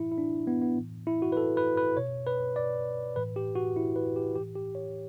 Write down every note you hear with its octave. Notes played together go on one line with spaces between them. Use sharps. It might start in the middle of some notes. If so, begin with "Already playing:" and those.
Already playing: A2 E3 E4
E4
D4
B3
B3
A2 E3
E4
F#4
B4
A4
B4
B4
B2 C#5
B4
D5
A2 E3 B4
G4
F#4
E4
B4
G4
A2 E3 G4
G4
C#5